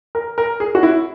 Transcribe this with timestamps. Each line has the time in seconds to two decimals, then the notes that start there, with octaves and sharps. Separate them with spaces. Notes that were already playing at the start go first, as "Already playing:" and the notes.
0.15 A#4
0.38 A#4
0.60 G#4
0.75 F#4
0.83 E4